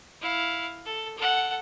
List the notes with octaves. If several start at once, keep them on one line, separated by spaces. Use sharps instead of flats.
E4 F5
A4
A4 F#5